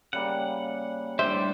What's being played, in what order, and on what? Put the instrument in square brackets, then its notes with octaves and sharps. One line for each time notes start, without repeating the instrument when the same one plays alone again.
[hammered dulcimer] C#3 G3 A#3 [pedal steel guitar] F#5
[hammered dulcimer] A2 [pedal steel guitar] G3 D4 G4 [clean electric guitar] C5 [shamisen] E5